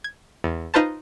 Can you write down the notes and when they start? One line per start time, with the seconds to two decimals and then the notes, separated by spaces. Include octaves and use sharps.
0.04 G#6
0.44 E2
0.74 D#4 F4 B4 C5 A5